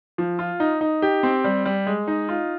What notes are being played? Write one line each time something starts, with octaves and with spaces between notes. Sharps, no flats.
F3
F4
D#4
D#4
G4
C4
G3
G3
G#3
D#4
F4